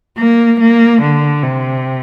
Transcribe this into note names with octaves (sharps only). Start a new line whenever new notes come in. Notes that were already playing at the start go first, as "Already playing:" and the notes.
A#3
A#3
D3
C3